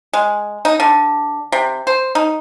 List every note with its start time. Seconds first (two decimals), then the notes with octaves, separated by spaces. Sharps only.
0.13 G#3
0.65 D#4
0.80 D3
1.52 C3
1.87 C5
2.15 D#4